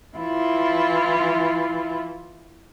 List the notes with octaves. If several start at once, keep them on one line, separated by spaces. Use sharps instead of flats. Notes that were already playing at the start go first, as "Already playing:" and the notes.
E3 E4 F4